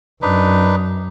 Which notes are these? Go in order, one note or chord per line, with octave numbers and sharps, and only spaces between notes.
F#2 D4 D#4 B4